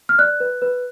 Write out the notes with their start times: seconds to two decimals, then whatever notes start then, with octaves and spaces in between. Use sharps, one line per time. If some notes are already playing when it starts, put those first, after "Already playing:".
0.09 F6
0.19 D5 F#6
0.40 B4
0.62 B4